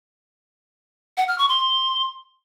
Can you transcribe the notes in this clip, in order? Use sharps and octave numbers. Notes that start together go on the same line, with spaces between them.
F#5
F6
C#6
C6